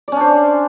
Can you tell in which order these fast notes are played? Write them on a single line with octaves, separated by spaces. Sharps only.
D5 C#4 D4 C5